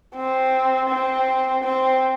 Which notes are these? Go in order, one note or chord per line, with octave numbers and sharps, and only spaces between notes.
C4
C4
C4